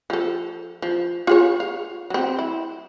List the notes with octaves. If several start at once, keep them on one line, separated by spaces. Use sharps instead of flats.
F3 A4
F3
F4 G#4 C#5
F5
F#3 C4
E4